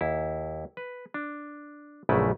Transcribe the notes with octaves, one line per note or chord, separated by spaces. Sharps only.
D#2 E4
B4
D4
A#1 F#2 C#3 A3 E4 B4